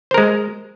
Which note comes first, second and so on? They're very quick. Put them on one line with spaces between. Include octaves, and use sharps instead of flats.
C5 A#4 G#3